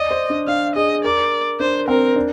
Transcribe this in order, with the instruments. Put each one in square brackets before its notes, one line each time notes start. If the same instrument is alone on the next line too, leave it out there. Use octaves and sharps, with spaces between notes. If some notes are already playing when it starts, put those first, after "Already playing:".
Already playing: [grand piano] D5 [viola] D#5
[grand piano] C5
D4
[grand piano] D4 [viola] F5
[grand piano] G#4 [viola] D#5
[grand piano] A#4 [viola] D5
[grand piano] D4 [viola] C5
[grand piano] C4 [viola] A#4
[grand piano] D4